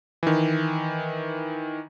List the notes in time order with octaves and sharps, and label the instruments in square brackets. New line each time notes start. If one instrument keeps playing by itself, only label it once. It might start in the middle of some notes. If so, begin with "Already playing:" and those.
[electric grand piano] D#3 E3